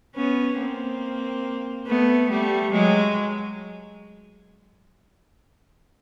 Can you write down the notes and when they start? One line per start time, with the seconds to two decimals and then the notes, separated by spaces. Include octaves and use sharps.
0.15 B3 C#4
0.59 A#3 C4
1.87 A3 B3
2.30 G3 A3
2.72 F#3 G#3